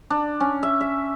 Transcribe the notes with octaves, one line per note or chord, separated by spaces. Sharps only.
D4
C#4
E5
E5